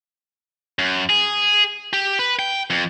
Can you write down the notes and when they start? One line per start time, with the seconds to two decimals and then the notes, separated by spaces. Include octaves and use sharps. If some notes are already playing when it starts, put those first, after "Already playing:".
0.79 F#2
1.10 G#4
1.93 G4
2.19 B4
2.39 G5
2.70 F2